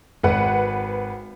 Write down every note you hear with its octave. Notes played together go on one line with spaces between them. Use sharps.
G#1 B4 F#5